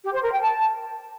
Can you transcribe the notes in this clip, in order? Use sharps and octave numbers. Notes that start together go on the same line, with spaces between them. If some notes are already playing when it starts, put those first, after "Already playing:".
G4
C5
A#4
G5
A5